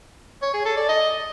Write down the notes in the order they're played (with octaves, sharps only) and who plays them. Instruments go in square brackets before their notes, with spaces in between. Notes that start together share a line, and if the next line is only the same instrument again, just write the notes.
[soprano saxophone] C#5
G#4
A4
D5
D#5